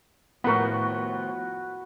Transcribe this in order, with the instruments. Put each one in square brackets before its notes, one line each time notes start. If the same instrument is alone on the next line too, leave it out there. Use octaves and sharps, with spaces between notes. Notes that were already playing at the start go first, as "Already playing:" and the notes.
[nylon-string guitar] D#2 A2 F3 [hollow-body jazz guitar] B3 [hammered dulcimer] F#4 B5 [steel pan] A#4 F#5